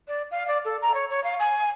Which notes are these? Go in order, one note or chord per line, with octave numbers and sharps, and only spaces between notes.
D5
F5
D5
A4
A#5
C#5
C#5
F5
G#5